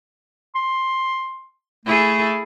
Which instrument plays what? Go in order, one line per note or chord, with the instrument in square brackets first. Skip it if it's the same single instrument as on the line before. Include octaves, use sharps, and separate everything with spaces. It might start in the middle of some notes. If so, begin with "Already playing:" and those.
[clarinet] C6
[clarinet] A3 [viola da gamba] E4 G#4 A4